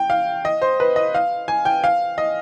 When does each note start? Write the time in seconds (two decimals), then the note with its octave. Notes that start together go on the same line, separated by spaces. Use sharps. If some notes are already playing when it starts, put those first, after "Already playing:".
Already playing: G5
0.10 F5
0.45 D#5
0.62 C5
0.80 B4
0.96 D#5
1.15 F5
1.48 G#5
1.65 G5
1.84 F5
2.18 D#5